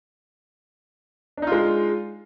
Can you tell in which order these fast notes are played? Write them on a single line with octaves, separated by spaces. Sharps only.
D4 D#4 F4 G#3